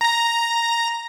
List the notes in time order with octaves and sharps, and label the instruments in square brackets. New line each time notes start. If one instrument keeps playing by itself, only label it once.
[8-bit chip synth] A#5 A#6